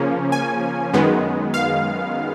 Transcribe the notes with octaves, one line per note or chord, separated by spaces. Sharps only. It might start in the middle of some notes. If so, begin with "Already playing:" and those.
Already playing: C#3 F3 A#3 C#4
G#5
F#2 D#3 G#3 B3
F5